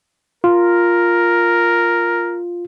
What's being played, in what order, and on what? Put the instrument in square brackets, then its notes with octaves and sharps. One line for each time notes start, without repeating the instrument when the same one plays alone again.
[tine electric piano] F4 [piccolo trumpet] A#4